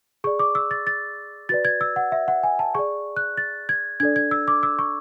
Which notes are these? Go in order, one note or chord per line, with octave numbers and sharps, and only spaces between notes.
G#4 D5 C#6
D6
E6
A6
A6
F#4 B4 D5 A6
G#6
E6
F#5
E5
F#5
G#5
A5
G#4 D5 C#6
F#6
A6
G#6
D4 A4 D5 G#6
G#6
E6
D6
E6
C#6